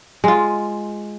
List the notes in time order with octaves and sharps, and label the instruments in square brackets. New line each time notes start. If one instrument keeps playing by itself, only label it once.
[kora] G#3 F4